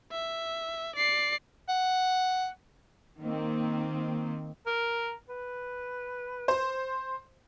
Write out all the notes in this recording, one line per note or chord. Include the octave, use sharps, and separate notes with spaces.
E5
D5 C7
F#5
D#3 A#3 C4
A#4
B4
C5